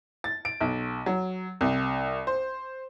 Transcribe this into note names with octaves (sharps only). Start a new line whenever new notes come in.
A6
D7
B1
F#3
C2
C5